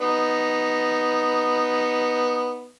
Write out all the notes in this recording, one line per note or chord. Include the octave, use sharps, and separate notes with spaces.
B3 D#4